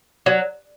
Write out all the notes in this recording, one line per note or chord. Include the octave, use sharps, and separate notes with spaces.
F#3